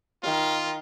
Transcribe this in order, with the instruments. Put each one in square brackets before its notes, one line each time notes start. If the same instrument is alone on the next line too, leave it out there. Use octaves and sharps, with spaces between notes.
[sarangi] D#3 [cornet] F4